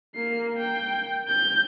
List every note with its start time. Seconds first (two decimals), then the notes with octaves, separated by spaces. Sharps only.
0.15 A#3 C7
0.57 G5
1.28 G6